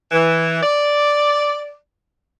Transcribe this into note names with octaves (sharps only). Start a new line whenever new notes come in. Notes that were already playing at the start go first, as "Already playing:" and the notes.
E3
D5